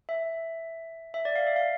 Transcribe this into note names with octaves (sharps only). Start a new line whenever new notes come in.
E5
E5
D5
F5
E5
F5